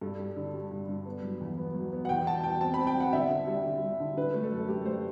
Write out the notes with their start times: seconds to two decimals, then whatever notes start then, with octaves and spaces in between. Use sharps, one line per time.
0.01 G2 A4
0.20 G3
0.37 D3
0.54 G3
0.71 G2
0.89 G2
1.06 B3
1.23 F#3
1.41 E2
1.58 B3
1.74 F#3
1.93 B3
2.05 F#5
2.09 E2 G5
2.27 B2 A5
2.43 E2 G5
2.61 C4 A5
2.74 C4 B5
2.87 G5
2.97 B2 F#5
3.13 D3 E5
3.30 D3
3.47 G3
3.66 D3
3.82 G3
4.00 D3
4.17 D3 B4
4.34 A3
4.43 A4
4.52 F#2
4.68 A3 G4
4.85 A3 C5